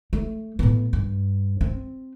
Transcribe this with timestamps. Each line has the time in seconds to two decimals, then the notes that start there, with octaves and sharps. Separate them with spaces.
0.13 A3
0.59 A2 B3
0.93 G2
1.61 C4